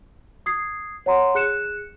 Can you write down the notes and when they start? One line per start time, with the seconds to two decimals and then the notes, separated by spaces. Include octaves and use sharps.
0.46 D#6 G#6 C7
1.06 C#5 F#5 A#5 C6
1.35 G#4 F#6 C#7 E7